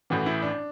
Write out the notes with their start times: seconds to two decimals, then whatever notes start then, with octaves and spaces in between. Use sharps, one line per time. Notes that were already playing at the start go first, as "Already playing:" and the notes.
0.10 A1 A2 E3 F#4
0.26 E4
0.42 D4